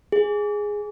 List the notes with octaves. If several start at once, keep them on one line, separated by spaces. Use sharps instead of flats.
G#4